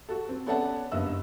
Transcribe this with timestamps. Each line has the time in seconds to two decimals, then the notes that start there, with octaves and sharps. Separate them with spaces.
0.09 F#4 A4
0.29 C4
0.46 B3 C#4 A4 D5 F#5 A5
0.92 F#1 G2 A#3 B3 D#5 E6